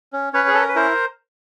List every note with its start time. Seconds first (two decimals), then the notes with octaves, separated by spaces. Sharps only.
0.13 C#4
0.33 C#4 B4 C#5
0.48 G#4
0.54 C#4 A4
0.61 A#4
0.68 B4
0.76 E4 A#4 C5